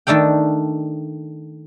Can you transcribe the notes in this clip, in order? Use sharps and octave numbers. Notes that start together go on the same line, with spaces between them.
D#3 A3 D4 A4 G5